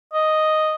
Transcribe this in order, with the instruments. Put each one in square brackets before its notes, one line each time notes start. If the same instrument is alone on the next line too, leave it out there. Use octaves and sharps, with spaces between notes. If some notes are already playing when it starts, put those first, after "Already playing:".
[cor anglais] D#5